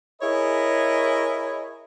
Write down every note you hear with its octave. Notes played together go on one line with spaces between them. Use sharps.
E4 G#4 A#4 C#5 D#5 B5